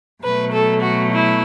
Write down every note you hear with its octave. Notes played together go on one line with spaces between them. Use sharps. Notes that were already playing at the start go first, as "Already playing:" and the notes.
B2 F#3 A3 B4
A4
F#4
E4